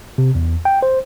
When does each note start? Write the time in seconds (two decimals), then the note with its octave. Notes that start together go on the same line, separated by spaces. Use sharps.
0.18 C3
0.35 E2
0.65 G5
0.83 C5